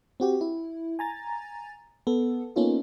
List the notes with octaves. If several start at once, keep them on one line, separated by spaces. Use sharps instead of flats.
C4 F#4 G4
E4
G#5 A#5 A6
B3 A4
A#3 B3 C#4 D#4 F4 A4